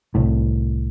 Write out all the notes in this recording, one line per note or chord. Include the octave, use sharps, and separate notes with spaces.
C2 A2